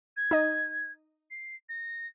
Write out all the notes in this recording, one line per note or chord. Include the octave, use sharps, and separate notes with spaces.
G#6
D#4 D#5
C7
A#6